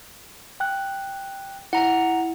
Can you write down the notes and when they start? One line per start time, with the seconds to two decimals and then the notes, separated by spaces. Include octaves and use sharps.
0.60 G5 F#6
1.73 E4 F#5 A#5